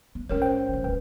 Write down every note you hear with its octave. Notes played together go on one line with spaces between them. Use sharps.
B3
G#1 C#4 F4 A#4 C#5
C5 G5
D1 D#3
D1 F3 B4 G5